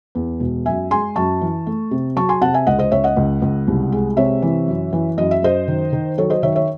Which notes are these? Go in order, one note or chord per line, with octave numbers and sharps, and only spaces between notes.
E2
E1
F#2 E5 G#5
G#3 G#5 C6
F#2 A5 C#6
E3
A3
C3
F#3 A5 C#6
G#5 C6
C3 F#5 A5
E5 G#5
C#2 D#5 F#5
C5 D#5
C#2 C#5 E5
D#5 F#5
C#2
C#2
C2
G#3
C3 C#5 E5
E3
F#2
E3
F#2 D#5
E5
F#2 C5 D#5
D#3
D#3
F#3 A4 C#5
C5 D#5
D#3 C#5 E5
C#5 E5